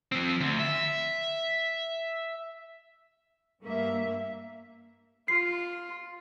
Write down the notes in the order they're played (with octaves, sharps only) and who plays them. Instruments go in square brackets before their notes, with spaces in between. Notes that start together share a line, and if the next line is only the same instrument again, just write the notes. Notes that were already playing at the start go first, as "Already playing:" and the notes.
[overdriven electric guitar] F3 C4
D2
E5
[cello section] G2 A#3 E5
[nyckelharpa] F4 [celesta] C7